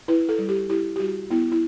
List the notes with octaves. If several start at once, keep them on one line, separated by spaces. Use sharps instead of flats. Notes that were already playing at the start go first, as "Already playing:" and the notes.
E4 B4
A4
G3
G4
E4 G4
G4
G3 F#4
B3 E4
E4